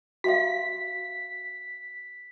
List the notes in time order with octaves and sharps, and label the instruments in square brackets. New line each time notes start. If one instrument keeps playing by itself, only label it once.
[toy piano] F#4 E5 F5 [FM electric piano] B6